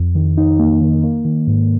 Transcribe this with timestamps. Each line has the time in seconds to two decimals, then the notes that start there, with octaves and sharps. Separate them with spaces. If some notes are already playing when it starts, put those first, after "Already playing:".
Already playing: F2
0.15 D#3
0.37 D#4
0.59 A#3
0.81 D#3
1.03 A#3
1.25 D#3
1.47 G#2